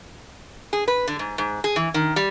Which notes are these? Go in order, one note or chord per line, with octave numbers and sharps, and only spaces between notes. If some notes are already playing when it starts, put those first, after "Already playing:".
G#4
B4
D3
G#2
G#2
G#4
E3
D#3
G3